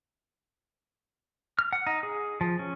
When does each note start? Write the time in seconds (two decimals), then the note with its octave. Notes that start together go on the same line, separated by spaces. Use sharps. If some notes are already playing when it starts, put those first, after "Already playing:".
1.59 F6
1.73 F#5
1.87 D#4
2.03 G#4
2.41 F3
2.59 C#4